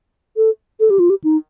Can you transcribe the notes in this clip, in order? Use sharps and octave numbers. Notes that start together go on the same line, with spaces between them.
A4
A4
G4
F4
G4
D#4